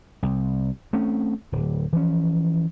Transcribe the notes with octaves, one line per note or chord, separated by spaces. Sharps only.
C2
A3 C4 C#4
D1
E3 F3 C#4